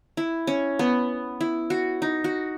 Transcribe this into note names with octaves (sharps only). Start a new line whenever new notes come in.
E4
C#4
B3
E4
F#4
D#4
F#4